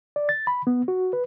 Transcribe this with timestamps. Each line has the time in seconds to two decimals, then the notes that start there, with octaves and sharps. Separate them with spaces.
0.16 D5
0.29 A6
0.47 B5
0.67 B3
0.88 F#4
1.13 B4